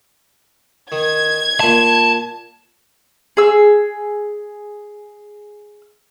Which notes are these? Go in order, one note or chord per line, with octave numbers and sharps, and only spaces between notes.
D#3 G#6
A#2 G#5 A5 C6
G#4 E6